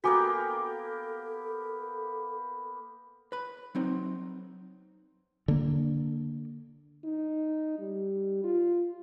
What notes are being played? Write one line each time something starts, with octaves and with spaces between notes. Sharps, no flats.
A#3 B3 F#4 G4 A4 G#5 D6
B4 B5
F#3 C4 D#4
D3 A#3
D#4
G3
F4